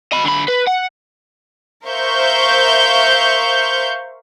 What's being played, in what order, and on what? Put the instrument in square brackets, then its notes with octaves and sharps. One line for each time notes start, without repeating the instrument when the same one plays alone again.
[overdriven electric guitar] D#5 B5
D3 B5
B4
F#5
[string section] A#4 C5 E5 F5 C#6 G6